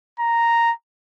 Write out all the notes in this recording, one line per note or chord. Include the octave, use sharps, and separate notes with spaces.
A#5